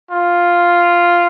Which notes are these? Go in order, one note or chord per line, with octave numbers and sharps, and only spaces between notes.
F4